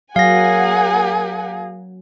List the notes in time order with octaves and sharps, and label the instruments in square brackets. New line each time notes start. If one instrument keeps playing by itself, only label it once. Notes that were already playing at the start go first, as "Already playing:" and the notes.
[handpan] F#3 [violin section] A#3 F#5 G#5 [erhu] G#4 [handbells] F5 A#6